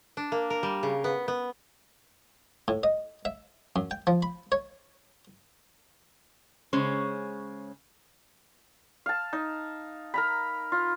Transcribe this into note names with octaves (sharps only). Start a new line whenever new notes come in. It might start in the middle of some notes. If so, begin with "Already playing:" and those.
D4
A#3
A#4
G3
C#3
B3
B3
A2
D#5
E5
F#2
G5
F3
B5
C#5
C#3 G#3 C#4 C5
F5 A5
D#4
A#4 A#5 B5
F4